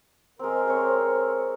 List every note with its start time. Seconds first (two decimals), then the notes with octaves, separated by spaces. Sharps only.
0.39 G#3 C4 A#4
0.68 C4 C#5